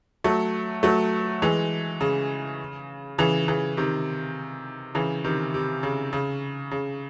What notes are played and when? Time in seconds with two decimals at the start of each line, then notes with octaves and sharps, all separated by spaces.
0.24 F#3 A3
0.83 F#3 A3
1.42 E3 G#3
2.01 C#3
3.18 C#3 E3
3.48 C#3 E3
3.77 C3 D#3
4.95 C#3 E3
5.24 C3 D#3
5.54 C3
5.83 C#3
6.13 C#3
6.71 C#3